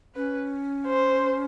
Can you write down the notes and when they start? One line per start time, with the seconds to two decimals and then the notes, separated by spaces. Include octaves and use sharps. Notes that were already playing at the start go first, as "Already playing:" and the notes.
0.15 C#4 B4
0.87 C5